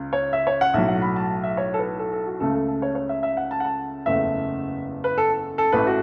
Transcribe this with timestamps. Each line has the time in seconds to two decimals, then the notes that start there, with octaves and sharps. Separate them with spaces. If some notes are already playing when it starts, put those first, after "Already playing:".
Already playing: C#2 C#3
0.13 C#5
0.33 E5
0.47 C#5
0.61 F#5
0.74 B1 A2 F#3 E5
0.88 F#5
1.02 B5
1.16 A5
1.43 E5
1.57 C#5
1.74 A4
1.79 B4
1.99 A4
2.13 A4
2.26 F#4
2.40 C#2 C#3 A3 A4
2.54 A4
2.68 A4
2.82 C#5
2.95 C#5
3.09 E5
3.23 E5
3.37 F#5
3.51 A5
3.60 F#5
3.65 A5
4.06 F#1 E2 C#3 A3 E5
5.04 B4
5.18 A4
5.58 A4
5.72 A1 A2 A3 B4
5.87 F#4